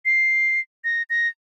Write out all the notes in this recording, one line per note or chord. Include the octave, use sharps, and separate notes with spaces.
C7
A#6
A#6